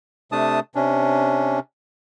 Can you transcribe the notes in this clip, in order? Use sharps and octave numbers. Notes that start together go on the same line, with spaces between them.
C3 A3 D4 A5 D#6
C3 C#4 D4